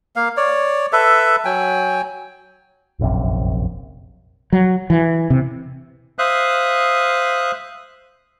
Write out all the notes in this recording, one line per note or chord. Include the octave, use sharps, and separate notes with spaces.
A#3 F5
C#5 D5
A4 B4 E5
F#3 G5 G#5
F1 A#1 F#2 C3
F#3
E3
C3
C5 E5 F5 D#6 F#6